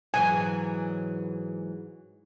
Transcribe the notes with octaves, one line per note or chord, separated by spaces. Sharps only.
G#2 E3 F#3 G#5